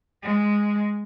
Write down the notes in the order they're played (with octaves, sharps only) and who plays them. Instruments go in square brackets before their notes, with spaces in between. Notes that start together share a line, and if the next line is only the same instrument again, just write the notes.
[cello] G#3